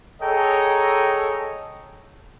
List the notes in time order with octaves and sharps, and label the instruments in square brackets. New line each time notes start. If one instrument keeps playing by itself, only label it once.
[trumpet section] G#4 A4 C#5 D#5 G5 A#5